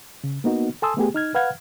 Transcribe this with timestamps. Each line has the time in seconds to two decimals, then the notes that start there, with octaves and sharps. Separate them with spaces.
0.24 C#3
0.44 A#3 B3 D#4 F#4
0.82 A4 G#5 A5 C6 D#6 E6
0.97 A3 B3 G4 G#4
1.15 D#4 F6 G#6
1.35 B4 F5 F#5 F6 G#6